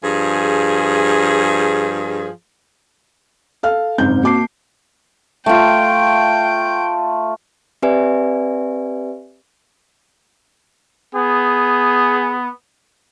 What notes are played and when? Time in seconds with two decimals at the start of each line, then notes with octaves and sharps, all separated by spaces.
0.03 G2 F3 G#4
3.63 A4 F5 F6
3.98 F#1 G#2 C4 G6
4.23 A#3 F#4 A5 D6 C7
5.46 A3 F4 G5
7.82 C4 G4 B4 D5 E5 G#5
11.15 B3 G#4